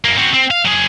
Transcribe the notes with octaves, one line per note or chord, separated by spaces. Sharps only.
F#2 A#3
C4 F#4
C4
F5
F#3 G#4